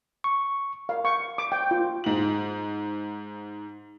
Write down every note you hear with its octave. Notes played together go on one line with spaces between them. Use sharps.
C#6
F5
C#6
D6
G5
F4
G#2 F#7